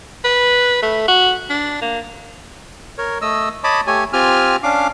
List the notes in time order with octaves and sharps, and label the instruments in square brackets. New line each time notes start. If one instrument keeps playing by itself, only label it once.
[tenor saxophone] B4
A3
F#4
D4
A#3
[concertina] A#4 C#5
A3 D#5 E6
C#5 D#5 A5 B5 D6
A3 G4 C#5 G#5
C4 F4 G4 G#5 F6
C#4 D4 F5 D6